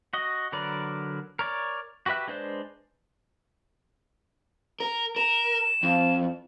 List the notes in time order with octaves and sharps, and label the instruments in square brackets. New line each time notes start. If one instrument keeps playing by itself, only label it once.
[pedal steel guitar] F#4 D#5
D3 F#3 A#4 B4 D5
A#4 C#5 D5
F#4 G4 B4 E5 F#6
G#3 D4 B4 C5 D5
[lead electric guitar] A#4
[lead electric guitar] A#4 [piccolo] E7
[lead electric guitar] F2